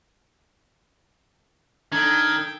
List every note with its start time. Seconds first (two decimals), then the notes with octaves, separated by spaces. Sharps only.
1.92 D#3 D4 A4 G5 G#6